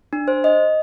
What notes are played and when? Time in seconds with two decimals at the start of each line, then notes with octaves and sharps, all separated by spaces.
0.13 D4
0.28 C5
0.44 D#5